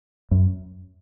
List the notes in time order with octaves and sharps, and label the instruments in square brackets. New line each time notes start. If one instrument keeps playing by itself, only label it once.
[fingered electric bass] F#2